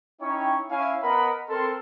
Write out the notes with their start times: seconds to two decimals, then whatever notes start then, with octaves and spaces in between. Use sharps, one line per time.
0.21 C#4 D#4 E4 C#5 G5
0.71 C#4 E4 C#5 E5 F5 G#5
1.03 B3 A#4 D#5 F#5 B5
1.50 C4 A4 A#4 C6